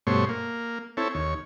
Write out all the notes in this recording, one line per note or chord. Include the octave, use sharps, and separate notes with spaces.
G2 B2 A3 C5 C#5
A#3
C4 E4 A4 C#5
D#2 C#5